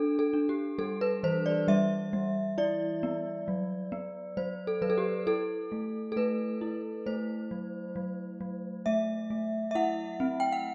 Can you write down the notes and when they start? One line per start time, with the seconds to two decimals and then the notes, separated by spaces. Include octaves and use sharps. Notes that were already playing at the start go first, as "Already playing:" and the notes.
Already playing: D4 A4
0.19 A4
0.33 D4
0.49 G4
0.78 G3 A4
1.01 B4
1.23 E3 C5
1.46 D5
1.68 G3 E5
2.13 G3
2.58 E4 D5
3.03 B3
3.48 F#3
3.92 B3
4.37 F#3 C5
4.67 A4
4.82 F#3 B4
4.90 A4
4.98 G4
5.27 E4 A4
5.72 A3
6.12 A4
6.16 A3 B4
6.61 E4
7.06 A3 C5
7.51 F#3
7.96 F#3
8.41 F#3
8.86 A3 E5
9.30 A3
9.71 E5
9.75 E4 F#5
10.20 C4
10.40 G5
10.52 F#5